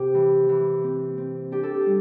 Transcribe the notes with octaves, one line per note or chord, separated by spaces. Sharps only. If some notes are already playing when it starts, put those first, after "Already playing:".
Already playing: C3 G4
E3
E3
C4
C4
D4 G4
A4
G4
G3